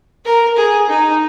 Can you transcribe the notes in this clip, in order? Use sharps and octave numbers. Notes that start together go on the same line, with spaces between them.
A#4
G#4
D#4